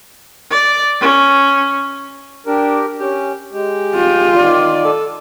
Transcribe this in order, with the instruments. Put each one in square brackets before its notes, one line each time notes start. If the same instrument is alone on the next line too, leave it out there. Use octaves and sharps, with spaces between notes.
[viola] D5
C#4
[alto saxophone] D4 [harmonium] G4 A#4
[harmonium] C#4 [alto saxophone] G4
[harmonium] G#3 [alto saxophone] G4
[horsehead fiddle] F4
[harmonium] D#3 D5
[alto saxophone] A4